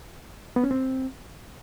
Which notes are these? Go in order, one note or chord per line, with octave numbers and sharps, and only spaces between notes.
B3
C#4
C4